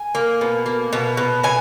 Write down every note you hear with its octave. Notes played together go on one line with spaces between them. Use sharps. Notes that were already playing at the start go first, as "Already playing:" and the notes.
Already playing: G#5
A#3
B2
A#3
B2
B2
B2 G#5